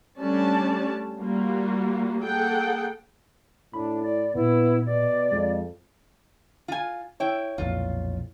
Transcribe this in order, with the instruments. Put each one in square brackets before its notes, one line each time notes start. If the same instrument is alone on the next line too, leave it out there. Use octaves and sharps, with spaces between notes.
[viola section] G3 A3 C#4 D4 D5 A5
G3 A#3 F4 F#4
A#3 G#4 A4 F#5 G5
[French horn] A2 [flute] D4 [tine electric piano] B5
[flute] D5
[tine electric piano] A#2 [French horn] B3 [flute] E4
[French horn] B2 [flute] D5
[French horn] F2 [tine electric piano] G#3
[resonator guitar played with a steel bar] F4 G#5
[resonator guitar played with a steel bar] E4 G5 [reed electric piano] C#5
[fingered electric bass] B1 F2 A#2 [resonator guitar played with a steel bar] F4